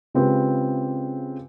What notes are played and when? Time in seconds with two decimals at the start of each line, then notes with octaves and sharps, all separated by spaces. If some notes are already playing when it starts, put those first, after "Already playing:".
0.15 C#3 G#3 C4 F4 G4 B4